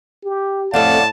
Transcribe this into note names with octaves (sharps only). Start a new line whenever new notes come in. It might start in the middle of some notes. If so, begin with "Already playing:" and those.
G4
F2 A2 G3 A3 D5 F5 F#5 A5